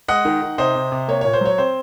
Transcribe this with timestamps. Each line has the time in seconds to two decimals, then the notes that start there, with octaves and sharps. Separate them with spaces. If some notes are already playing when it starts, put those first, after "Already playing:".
0.08 G#3 D#5 F#5
0.25 D#3
0.42 D#3
0.58 C3 C5 D#5
0.75 C3
0.92 C3
1.08 A#3 C#5
1.21 A#2 C#5
1.33 C5
1.41 F#3 C#5
1.58 C4 C5